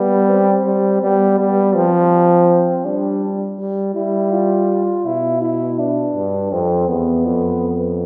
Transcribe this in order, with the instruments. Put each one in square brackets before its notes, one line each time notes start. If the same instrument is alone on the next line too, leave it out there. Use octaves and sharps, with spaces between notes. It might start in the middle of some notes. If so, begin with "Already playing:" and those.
Already playing: [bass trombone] G3 [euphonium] B3
[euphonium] C4
[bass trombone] G3 [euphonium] C4
[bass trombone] G3 [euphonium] B3
[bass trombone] G3
[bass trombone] F3 [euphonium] C4
[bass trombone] G3 [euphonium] D4
[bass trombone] G3
[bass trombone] G3 [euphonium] E4
[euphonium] F4
[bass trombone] B2 [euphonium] E4
[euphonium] E4
D4
[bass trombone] G2
[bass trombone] F2 [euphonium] C4
[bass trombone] E2 [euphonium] B3
[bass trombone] F2